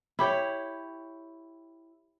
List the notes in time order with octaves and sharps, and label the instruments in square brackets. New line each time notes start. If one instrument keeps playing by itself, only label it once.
[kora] E4 G4 C#5